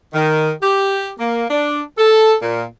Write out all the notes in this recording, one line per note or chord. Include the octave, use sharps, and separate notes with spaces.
D#3
G4
A#3
D4
A4
A#2